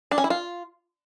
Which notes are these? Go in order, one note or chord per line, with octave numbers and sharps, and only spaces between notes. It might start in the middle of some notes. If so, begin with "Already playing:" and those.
D4
C#4
E4
F4